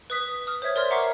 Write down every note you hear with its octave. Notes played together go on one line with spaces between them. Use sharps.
B4 D#6 B6
D#6 F6
C5 C#5 E5 G#6
A#4 D5 C6 F6
E5 F#5 A#5 C#6 D6 C7